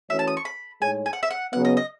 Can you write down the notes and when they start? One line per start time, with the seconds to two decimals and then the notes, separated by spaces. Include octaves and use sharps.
0.10 E3 A3 C#4 F#4 C#5 E5
0.19 A5
0.28 D#6
0.37 C#6
0.45 B5
0.81 A2 G#3 D#4 G#4 C#5 G#5
1.06 G#5
1.13 F#5
1.23 E5
1.31 F#5
1.53 C#3 F#3 B3 F#5
1.65 D#5
1.77 D#5